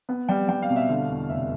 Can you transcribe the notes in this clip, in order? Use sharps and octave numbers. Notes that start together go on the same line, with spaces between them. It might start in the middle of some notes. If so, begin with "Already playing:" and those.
B3
G3 G5
G3 G5
F5
B2
E5
D3 F5
E2
F1 E5